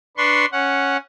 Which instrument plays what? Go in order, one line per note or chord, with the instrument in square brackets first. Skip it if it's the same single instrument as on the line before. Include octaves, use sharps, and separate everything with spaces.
[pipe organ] D4 B4 C6 C#6
C#4 F#5